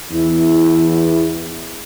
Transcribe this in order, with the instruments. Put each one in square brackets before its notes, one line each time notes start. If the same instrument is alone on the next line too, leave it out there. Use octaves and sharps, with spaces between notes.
[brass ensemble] E2 [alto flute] E4